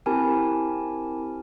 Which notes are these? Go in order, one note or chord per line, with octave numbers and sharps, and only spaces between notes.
C4 E4 G4 A#4 G#5 A5